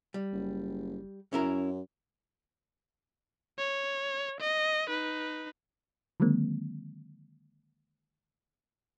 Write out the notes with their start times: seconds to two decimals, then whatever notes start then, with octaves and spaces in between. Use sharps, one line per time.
0.14 G3
0.33 F#1
1.33 F#2 C#4 E4 A#4
3.58 C#5
4.40 D#5
4.88 D#4 B4
6.20 D3 D#3 F#3 G#3 A#3 C4